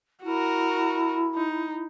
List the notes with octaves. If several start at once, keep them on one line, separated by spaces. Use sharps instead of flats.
E4 F#4 A#4
D#4